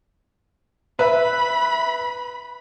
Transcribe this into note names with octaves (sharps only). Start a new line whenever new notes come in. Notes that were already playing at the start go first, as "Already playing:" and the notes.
B4 E5 B5